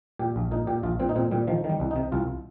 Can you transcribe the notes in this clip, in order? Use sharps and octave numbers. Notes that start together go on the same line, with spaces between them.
A#2 G4
A#1
A#2 D#4
A#2 G4
A#1 F4
A#2 C4
D#4
A#2 C4
A#2 G3
D#3 F3
D#3
G3
C2
C3 D#4
C2 F4